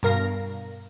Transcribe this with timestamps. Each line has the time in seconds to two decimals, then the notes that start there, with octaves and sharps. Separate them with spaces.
0.03 G2 B2 A#4 F5 A#6